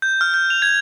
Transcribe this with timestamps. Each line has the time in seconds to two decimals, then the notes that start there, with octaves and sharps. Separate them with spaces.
0.02 G6
0.21 F6
0.34 G6
0.50 F7
0.62 G#6